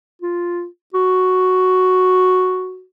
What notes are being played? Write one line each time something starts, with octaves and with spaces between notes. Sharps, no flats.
F4
F#4